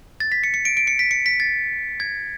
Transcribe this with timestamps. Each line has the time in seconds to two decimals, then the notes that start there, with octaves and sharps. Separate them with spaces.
0.20 A6
0.32 B6
0.44 C#7
0.54 C#7
0.65 D7
0.77 D7
0.87 C#7
0.99 B6
1.11 C#7
1.26 B6
1.40 A6
2.00 G#6